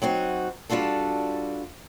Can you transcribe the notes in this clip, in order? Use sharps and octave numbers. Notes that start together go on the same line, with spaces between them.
F#3 C4 D#4 F#4
G3 D4 F4 F#4 A4